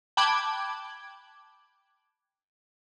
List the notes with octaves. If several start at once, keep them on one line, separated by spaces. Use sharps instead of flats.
G5 A5 B5 D6 F#6 G#6